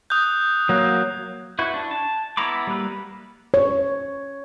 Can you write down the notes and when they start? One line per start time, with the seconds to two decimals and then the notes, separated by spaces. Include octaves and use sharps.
0.10 D#6 F#6 G6
0.69 F#3 A#3
1.59 E4 F#4 B4
1.74 D4
1.91 A5
2.37 B3 E4 A#5 B5 D6
2.67 G3 A#3 B4
3.54 C#5